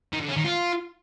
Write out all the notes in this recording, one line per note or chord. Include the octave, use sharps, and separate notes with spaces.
D#3
D3
C#4
D#3
F4